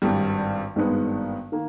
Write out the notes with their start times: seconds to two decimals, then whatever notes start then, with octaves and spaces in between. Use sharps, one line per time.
0.02 G#1 G2 G3
0.76 G#1 G2 D#3 G#3 B3
1.52 D#3 A#3